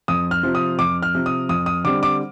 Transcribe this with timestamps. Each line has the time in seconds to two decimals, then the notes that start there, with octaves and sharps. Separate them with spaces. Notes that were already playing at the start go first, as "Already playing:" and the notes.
0.08 F2 D#6
0.31 F6
0.43 C3 F3
0.55 D#6
0.79 F2 D6
1.03 F6
1.15 C3 F3
1.26 D#6
1.49 F2 D#6
1.66 D#6
1.84 D3 G3 C4 D6
2.03 D6